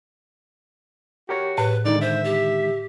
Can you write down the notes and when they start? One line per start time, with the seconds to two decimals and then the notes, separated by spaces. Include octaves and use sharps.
1.29 F#4 G4 A#4 C#5
1.58 A2 B4
1.85 D3 D#3 G#3 D#4 D5
2.01 C5 E5
2.24 G4